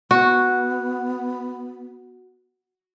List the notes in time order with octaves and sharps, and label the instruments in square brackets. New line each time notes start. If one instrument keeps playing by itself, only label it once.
[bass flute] B3 [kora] F#4